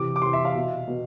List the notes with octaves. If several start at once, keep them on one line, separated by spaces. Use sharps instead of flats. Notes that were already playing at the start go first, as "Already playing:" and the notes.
Already playing: C3 E3 D6
D6
C3 E3 C6
E5
F5
B2
B2